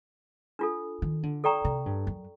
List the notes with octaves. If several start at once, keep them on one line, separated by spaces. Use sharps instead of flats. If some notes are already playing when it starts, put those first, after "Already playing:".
D4 F4 A4
D#3
D3
A4 D5 G5 A#5 C#6
C3
G2
F#2